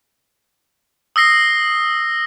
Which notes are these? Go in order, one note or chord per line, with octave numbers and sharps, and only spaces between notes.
D#6 E6 A#6 C7